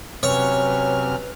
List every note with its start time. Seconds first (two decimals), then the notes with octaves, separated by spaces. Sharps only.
0.23 C3 F#3 C#4 B4 C#5 F6